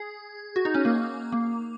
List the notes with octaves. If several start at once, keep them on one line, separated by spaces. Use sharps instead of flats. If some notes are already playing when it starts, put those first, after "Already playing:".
Already playing: G#4
F#4
D#4
C#4
A#3
A#3